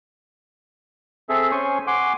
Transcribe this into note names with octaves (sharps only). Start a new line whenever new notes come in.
C4 G#4 A4 E5
C#4 C5 G#5 C#6
F#5 G#5 C6 D6